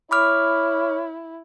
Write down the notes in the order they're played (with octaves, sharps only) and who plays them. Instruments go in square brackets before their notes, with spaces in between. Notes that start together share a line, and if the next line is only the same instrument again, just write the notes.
[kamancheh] E4 [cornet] C#5 [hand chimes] B5 D6 F6